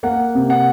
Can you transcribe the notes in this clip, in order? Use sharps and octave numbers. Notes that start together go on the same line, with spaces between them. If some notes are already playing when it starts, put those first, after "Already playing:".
A#3 F#5
C3
F#5